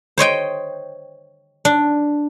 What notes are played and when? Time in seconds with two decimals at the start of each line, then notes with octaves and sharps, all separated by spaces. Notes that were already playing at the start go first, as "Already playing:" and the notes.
0.18 C5 C#5 D#5 G5
1.65 D4